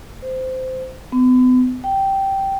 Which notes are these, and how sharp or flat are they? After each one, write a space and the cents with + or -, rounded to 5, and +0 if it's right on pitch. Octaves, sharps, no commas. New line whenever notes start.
C5 -15
B3 +40
G5 -10